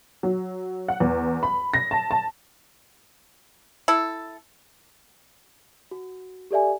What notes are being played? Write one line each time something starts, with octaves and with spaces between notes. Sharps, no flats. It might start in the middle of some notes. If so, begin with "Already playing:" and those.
F#3
F#5
E2
B5
A#6
A5
A5
E4 A4
F#4
G4 A4 D5 E5 G#5